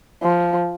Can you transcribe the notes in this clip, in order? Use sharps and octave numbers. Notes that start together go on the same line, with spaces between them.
F3